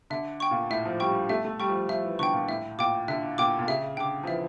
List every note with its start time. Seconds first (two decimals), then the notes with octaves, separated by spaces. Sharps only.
0.10 D3 E5
0.40 G5 C#6
0.51 A#2
0.70 A2 E5
0.85 F3
1.00 G3 G5 C#6
1.29 A3 E5
1.45 A3
1.60 G3 G5 C#6
1.68 F3
1.75 G3
1.89 F3 E5
2.05 E3
2.19 D3 G5 C#6
2.33 A#2
2.49 A2 E5
2.79 A#2 G5 D6
3.08 D3 E5
3.38 A#2 G5 D6
3.59 A#2
3.67 C#3 E5
3.97 D3 G5 D6
4.23 F3
4.27 E3 E5